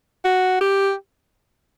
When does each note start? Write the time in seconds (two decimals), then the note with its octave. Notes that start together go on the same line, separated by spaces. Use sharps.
0.25 F#4
0.61 G4